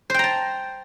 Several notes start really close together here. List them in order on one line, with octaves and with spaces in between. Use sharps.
C5 G5 A#5 A5